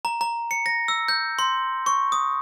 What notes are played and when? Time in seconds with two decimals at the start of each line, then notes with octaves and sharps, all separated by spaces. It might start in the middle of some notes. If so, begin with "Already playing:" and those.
0.05 A#5
0.21 A#5
0.51 C#7
0.66 A#6
0.88 E6
1.08 G6
1.39 C6
1.86 C#6
2.12 D#6